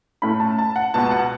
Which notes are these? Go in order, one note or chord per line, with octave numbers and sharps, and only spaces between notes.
A2 A3 C#4 B5
A5
A5
F#5
C#2 B2 B3 A5
F#5